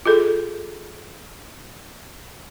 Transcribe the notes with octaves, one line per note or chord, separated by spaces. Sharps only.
F4 G#4 A4